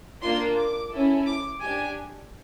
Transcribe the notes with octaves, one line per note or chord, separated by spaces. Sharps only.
A#3 D4 F4 C6
D6
C#4 E4 A4
D6
D4 G4 G#5